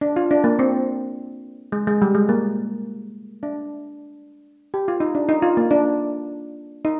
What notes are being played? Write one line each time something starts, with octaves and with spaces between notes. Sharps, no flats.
D4
F4
D4
A#3
C4
G#3
G#3
G3
G#3
A#3
D4
G4
F4
D#4
D4
D#4
F4
A#3
D4
D#4